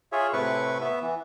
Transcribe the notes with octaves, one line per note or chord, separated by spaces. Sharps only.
F4 G#4 C#5 E5
A2 C3 E4 B4 C#6
B3 E5
E3